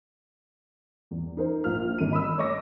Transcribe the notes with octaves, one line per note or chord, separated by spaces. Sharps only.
E2
D#4 A#4 C5
A#1 F4 F6
G#1 D#7
D#5 B5 D#6 E6
C#5 D#5 C#6 D6 E6 A#6